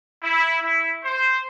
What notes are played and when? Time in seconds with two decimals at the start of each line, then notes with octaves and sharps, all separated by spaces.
0.23 E4
0.61 E4
1.04 C5